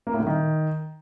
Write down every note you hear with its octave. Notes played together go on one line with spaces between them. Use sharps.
A#3
A2
D3
D#3